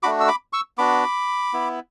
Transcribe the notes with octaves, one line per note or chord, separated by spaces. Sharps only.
A3 D4 F#4 B5 D6
E6
B5 D6
C#6 E6
B3 D4 F#4 B5 D6
B3 E4